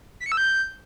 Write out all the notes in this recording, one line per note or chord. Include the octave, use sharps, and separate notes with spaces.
B6
C#7
E6
G6